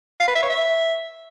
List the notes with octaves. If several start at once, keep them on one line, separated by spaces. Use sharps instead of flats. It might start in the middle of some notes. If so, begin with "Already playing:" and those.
F5
B4
E5
C#5
E5